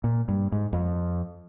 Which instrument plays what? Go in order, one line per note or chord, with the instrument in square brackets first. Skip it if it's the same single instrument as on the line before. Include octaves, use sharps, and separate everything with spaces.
[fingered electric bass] A#2
G2
G#2
F2